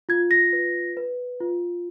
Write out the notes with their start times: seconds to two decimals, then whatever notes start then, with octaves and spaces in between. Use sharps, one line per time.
0.09 F4 G#6
0.31 A#6
0.53 B4
0.97 B4
1.40 F4